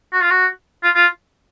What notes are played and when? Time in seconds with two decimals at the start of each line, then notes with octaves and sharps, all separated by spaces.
0.13 F#4
0.22 F4
0.31 F#4
0.83 F4
0.95 F4